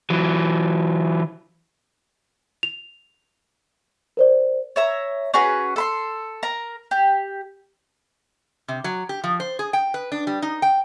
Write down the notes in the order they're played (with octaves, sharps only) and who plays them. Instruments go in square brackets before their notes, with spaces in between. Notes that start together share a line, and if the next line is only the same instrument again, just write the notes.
[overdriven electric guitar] E3 F#3
[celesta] F7
A#4 C5 D5
[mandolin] C#5 E5 A#5
C#4 F#4 G#4 B4
A4 B5 C6
A#4 A#5
G4
[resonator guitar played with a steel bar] C3
F#3
G4
F3
C5
G#4
G5
B4
D4
G3
D#4
G5